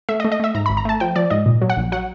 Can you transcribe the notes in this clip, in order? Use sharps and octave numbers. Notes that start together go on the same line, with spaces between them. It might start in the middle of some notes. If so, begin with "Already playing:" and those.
A3 E5
D#5
A3
D#5
A3 E5
G#2 A#5
G#1 B5
A#5
A3 A5
F3 G5
F3 D5
G#2 D#5
A#2
F#3
F#5
A#1
F#3 F#5